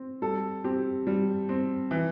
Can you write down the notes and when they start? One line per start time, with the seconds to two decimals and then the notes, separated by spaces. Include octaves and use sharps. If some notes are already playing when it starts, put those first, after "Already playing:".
Already playing: C4
0.22 G3 A4
0.64 C4 G4
1.07 G3
1.49 C4
1.91 E3